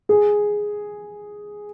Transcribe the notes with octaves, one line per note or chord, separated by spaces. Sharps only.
G#4